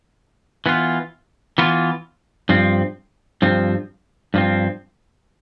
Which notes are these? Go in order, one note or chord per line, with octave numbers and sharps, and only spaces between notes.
E3 B3 F4
E3 B3 F4
G2 F3 C4
G2 F3 C4
G2 F3 C4